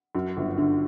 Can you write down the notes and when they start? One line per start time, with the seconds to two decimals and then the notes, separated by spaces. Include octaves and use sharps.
0.15 F#2
0.37 G1
0.58 D3